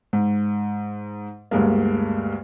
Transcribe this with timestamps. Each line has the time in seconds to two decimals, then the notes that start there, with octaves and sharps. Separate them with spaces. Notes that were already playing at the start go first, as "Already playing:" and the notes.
0.13 G#2
1.51 D2 G2 G#3 A#3